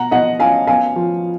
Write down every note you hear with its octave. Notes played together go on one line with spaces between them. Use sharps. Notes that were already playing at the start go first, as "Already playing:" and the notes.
Already playing: B2 F#5 A#5
B2 D#5 F#5
C#4 F5 G#5
B3 F5 G#5
F3